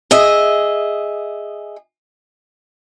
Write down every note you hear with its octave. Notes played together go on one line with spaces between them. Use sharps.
G#4 D#5 E5